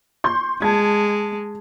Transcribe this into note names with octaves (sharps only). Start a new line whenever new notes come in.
C6 C#6 G6
G#3 A5 G#6